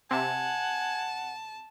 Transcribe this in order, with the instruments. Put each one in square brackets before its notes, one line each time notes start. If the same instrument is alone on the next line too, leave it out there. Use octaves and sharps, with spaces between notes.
[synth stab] C3 [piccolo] F#5 [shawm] G#5 [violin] A5